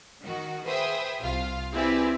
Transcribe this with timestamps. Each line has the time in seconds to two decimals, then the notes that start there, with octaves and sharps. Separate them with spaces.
0.23 D#3 F#4
0.66 G#4 B4 C5 E5 G5 D#6
1.21 C2 F4 F5
1.73 C4 E4 G4 G#4 B4 D5